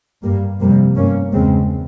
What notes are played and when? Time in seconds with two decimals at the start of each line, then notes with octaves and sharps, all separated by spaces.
0.23 G2 G3 A#3
0.59 F2 C3 G3 A#3
0.96 G2 A#3 C#4
1.32 E2 C#3 G#3 C4